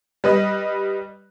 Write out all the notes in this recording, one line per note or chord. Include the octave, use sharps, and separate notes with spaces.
G3 B4 D#5